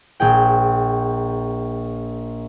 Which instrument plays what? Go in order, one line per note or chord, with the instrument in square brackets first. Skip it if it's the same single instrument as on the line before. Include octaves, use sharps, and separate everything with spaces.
[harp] A#1 G#4 G5